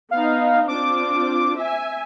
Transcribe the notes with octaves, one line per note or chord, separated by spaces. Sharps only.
B3 D#4 F5
C4 D4 F4 D6
E5 G#5